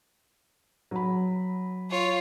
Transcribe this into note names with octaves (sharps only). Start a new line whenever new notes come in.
F#3 B5
F4 C#5